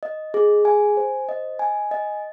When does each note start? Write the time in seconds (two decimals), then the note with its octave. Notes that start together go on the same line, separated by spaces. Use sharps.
0.03 D#5
0.34 G#4
0.65 G#5
0.97 C5
1.29 D#5
1.59 G#5
1.91 D#5